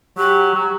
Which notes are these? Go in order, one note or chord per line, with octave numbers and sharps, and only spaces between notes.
F#3 G4
F#3